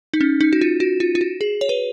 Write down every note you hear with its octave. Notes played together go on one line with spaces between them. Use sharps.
D#4
C#4
D#4
F#4
F4
F#4
F4
F4
F#4
G#4
C#5
B4